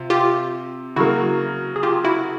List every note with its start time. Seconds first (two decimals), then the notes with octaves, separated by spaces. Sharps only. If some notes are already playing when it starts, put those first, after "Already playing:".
Already playing: C3 F4
0.10 F4 G4
0.96 C#3 F#3 A#3 E4 F#4
1.76 G#4
1.83 F4 G4
2.04 E4 F#4